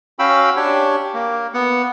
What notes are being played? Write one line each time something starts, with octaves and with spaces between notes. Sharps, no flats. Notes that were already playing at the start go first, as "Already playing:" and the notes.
C#4 F#4 F5 G5 B5 E6
D4 G4 C#5
A#3
B3 F#5